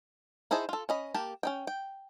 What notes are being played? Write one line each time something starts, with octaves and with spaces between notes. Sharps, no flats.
D#4 E4 G#4 C5 A5
F4 A4
C#4 D#5 B5
A#3 G4 A5
C#4 D#4 G5
G5